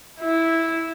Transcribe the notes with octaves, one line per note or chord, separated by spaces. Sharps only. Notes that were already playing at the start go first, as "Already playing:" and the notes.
E4